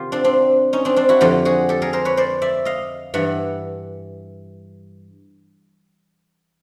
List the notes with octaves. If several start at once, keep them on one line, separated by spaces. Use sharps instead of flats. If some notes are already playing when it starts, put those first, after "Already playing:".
Already playing: C3 D#3 F4 G4
C4 D4
C4 D4
C#4 D#4
C4 D4
C4 D4
E4 F#4
F2 D3 F3 F4 G4
F#4 G#4
G4 A4
G#4 A#4
A#4 C5
B4 C#5
C5 D5
D5 E5
D#5 F5
G2 E3 E5 F#5